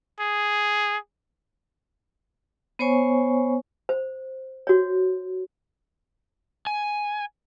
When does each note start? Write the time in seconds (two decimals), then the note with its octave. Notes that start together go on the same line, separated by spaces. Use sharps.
0.20 G#4
2.79 B3 C5 C#5 G#5 C#6
3.89 C5
4.67 F#4 C#5
6.67 G#5